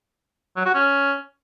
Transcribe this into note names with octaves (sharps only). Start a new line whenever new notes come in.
F#3
F#4
C#4